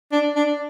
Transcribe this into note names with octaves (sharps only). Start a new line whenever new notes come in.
D4
D4